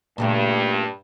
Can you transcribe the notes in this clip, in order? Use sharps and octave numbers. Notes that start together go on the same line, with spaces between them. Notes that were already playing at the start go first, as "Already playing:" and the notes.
G2 A#2 C#3 A3